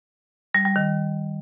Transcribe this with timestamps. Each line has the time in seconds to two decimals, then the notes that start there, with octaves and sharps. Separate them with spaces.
0.55 G3
0.65 G3
0.76 D#3